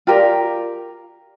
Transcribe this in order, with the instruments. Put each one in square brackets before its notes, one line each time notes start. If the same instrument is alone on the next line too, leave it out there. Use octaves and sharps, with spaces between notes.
[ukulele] F4 G4 A#4 D5